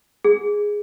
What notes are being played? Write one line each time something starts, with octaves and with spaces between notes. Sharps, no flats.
G#4